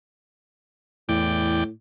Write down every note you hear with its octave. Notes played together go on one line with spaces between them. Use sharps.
E2 A2 D5 G5